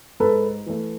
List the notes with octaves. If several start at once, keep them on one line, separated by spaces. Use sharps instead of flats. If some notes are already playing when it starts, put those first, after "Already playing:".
G#2 A4 B4
E3 A3